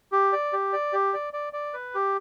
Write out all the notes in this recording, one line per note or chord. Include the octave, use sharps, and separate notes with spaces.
G4
D5
G4
D5
G4
D5
D5
D5
B4
G4